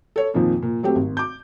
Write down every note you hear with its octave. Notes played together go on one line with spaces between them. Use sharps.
A4 C#5
F2 A#2 D#3 F3
A#2
F#3 A3 C4 G4
G#1
D6 G6